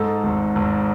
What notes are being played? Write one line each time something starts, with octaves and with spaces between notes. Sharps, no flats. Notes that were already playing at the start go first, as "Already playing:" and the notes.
Already playing: G#2 A4
G#1
G#1